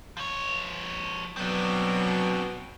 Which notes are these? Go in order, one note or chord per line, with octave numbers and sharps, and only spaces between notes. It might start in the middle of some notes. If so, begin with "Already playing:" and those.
F3 C#5
B2 F#3 C4 D4